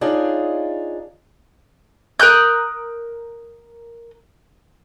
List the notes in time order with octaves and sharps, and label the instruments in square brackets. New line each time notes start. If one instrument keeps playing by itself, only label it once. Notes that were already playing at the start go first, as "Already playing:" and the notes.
[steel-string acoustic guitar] D4 D#4 F4 G#4 C#5 D5
[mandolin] A#4 D#6 F#6 G6